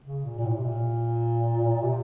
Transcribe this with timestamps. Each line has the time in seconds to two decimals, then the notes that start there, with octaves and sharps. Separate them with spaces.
0.04 C#3
0.24 A#2
0.38 A#2
0.45 A2
0.56 C3
0.64 A#2
1.82 C3